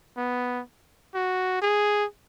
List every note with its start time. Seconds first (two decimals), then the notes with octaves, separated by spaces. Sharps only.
0.17 B3
1.15 F#4
1.62 G#4